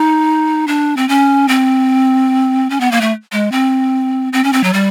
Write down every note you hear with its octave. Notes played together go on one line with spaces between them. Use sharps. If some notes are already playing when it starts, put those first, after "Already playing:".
Already playing: D#4
D4
C4
C#4
C4
C#4
B3
A#3
A3
G#3
C4
C4
C#4
C4
F#3
G3